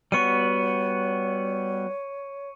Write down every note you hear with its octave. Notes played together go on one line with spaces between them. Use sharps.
G3 B3 F#4 C#5 C#6 C#7 D#7